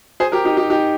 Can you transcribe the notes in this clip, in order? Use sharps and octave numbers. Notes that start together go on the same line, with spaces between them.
G#4 C5
G4 A#4
D#4 G4
D#4 G4
D#4 G4